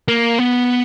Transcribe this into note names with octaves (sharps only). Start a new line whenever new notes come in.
A#3
B3